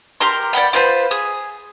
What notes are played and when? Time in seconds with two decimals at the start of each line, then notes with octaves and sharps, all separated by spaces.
0.21 G4 A#4 A#5 C6
0.53 D5 F#5 G5 B5
0.73 F4 B4 C5 B5
1.11 G#4